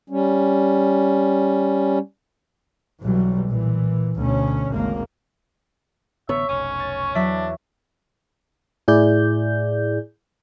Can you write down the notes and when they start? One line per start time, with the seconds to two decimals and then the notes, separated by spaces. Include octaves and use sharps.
0.10 G3 C#4
3.02 B1 E3 F#3 G3
3.48 A#2 E3
4.15 D2 B2 C#4
4.72 G#1 D2 C#3 A#3
6.29 A1 D3 B3 C#5 E5
6.49 F1 B1 C#4
6.79 A6
7.15 E2 E3 F#3 D4 E5 B6
8.88 A2 E4 G#4 D5 G6